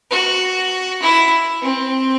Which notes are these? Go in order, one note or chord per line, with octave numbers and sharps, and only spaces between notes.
F#4
E4
C4